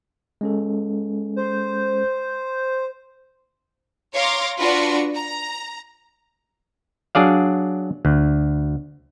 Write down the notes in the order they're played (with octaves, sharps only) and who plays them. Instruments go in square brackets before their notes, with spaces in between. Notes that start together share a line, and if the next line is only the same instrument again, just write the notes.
[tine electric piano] G#3 C#4 A4
[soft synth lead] C5
[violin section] C#5 F5 A#5 C6 D6 A#6
D4 F4 F#4 B4 C#6 A#6
A#5
[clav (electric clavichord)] F#3 D4 G#4 D5 F5
D2